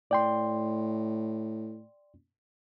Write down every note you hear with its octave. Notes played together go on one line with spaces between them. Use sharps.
A2 D5 G5 C6